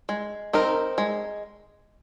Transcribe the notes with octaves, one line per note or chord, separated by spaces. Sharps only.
G#3
C4 D#4 A#4
G#3